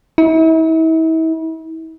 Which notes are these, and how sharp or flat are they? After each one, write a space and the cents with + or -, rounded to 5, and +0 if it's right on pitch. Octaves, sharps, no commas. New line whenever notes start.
E4 -40